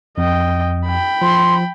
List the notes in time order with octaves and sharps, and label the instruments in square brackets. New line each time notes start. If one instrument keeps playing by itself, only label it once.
[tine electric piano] F2 [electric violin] D#5 G5
[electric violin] G5 B5
[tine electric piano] F3 [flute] C6